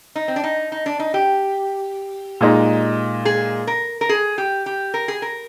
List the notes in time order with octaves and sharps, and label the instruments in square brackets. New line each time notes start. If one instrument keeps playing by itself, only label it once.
[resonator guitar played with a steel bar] D#4
C4
D4
D#4
D#4
D4
D#4
G4
[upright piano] A#2 G#3 D#4
[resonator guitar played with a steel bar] G#4
A#4
A#4
G#4
G4
G4
A#4
G#4
A#4